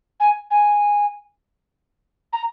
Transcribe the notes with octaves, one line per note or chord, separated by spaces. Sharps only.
G#5
G#5
A#5